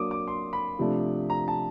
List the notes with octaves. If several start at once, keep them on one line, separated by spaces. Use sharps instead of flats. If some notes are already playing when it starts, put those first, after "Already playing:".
Already playing: F#3 A#3 D4 D6 D#6
D6
C6
B5
C3 F3 A3 D4
A#5
A5